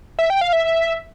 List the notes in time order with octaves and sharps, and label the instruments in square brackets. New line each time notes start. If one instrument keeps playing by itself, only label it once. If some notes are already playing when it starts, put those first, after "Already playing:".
[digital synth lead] E5
G5
F5
E5